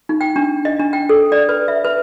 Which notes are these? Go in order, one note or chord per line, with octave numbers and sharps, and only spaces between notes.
D#4
G5
D4
D#5
D4
G5
A4
D5
B4
E5
B4